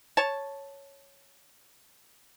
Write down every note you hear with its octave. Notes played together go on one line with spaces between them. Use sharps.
C#5 A5